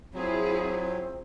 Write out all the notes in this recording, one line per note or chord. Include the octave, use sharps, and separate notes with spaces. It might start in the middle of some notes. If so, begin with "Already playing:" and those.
F#3 C4 E4 F4 G#4